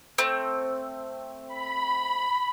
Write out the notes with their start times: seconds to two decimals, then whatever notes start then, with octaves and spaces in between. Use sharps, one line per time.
0.18 A3 C4
1.48 B5